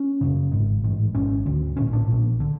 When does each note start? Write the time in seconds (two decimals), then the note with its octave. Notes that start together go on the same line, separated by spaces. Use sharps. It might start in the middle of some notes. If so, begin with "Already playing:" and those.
Already playing: C#4
0.21 F#1 F#2 C#3
0.52 G#1 G#2
0.84 A1 G#2
1.15 G#1 G#2 C#4
1.46 D2 D3
1.77 A#1 A2 C#4
1.93 D4
2.08 B1 A#2
2.40 D3